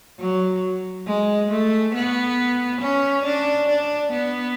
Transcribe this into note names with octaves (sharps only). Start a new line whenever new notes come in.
F#3
G#3
A3
B3
C#4
D4
D4
B3